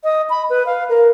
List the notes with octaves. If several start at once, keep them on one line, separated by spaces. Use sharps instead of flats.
D#5
B5
B4
F5
A#4